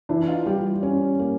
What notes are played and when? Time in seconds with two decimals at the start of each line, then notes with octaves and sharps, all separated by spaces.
0.09 E3 D4 E4
0.28 D#4 F4
0.46 G3 F4 G4
0.83 C#4
1.19 A#3